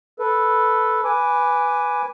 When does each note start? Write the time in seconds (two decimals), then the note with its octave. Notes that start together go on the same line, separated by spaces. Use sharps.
0.19 A4 B4
1.04 B4 G#5 D6